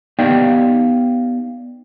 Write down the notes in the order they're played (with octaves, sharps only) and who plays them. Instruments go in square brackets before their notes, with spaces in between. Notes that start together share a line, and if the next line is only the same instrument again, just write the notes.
[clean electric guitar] B3 D#4 G4 D5 F5 G5